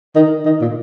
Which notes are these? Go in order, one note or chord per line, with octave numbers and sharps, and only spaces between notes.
D#3
D#3
A#2